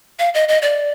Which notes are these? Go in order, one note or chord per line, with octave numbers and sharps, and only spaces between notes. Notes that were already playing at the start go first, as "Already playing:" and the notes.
F5
D#5
D#5
D5